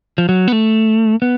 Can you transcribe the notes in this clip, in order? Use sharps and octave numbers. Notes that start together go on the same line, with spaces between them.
F3
F#3
B3
A3
B3